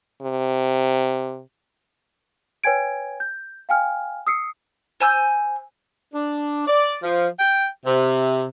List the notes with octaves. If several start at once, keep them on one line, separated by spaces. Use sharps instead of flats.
C3
B4 C#5 G5 G#5 G#6 D7
G6
F5 G5 G#5 F6
D#6 E6 C7 C#7
C5 G#5 E6 G6
D4
D5
F3
G5
C3